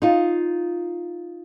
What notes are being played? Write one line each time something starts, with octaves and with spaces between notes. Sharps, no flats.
D#4 F4